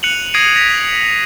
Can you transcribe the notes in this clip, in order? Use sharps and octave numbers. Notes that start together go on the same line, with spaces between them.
F#6 C#7 D#7 F7 F#7
D#6 G#6 A#6 C7 D7 D#7
A#6 B6 F7